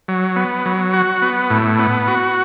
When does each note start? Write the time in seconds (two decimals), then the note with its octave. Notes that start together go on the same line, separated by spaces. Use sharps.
0.08 F#3
0.36 B3
0.66 F#3
0.94 F#4
1.22 B3
1.50 A2
1.79 B3
2.08 F#4